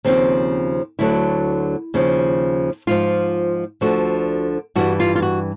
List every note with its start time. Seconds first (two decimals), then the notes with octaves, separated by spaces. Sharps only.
0.04 D#2 C#3 F3 C4
0.99 D2 D3 F#3 E4
1.94 D#2 C#3 F3
2.87 G#2 F3 F4
3.81 D2 D3 F3 F#4
4.75 G2 E3 G3 F#4
5.00 F4
5.15 F4
5.22 F#4